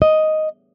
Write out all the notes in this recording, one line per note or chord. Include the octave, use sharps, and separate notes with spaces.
D#5